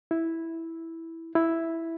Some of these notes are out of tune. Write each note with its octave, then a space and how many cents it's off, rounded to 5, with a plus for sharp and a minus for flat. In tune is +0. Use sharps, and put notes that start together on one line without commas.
E4 -5
E4 +0